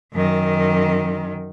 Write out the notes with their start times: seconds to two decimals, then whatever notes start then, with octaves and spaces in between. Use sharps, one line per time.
0.13 F#2 D#3